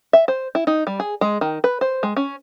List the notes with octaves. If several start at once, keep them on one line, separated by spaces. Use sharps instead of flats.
E5
C5
E4
D#4
G3
G#4
G#3
D#3
B4
C5
G#3
C#4